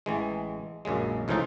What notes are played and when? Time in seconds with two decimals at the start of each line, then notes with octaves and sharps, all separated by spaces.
0.06 A1 E3 G#3
0.85 A#1 F#2 C#3 G#3
1.28 C#2 A2 E3 F3 D#4 F4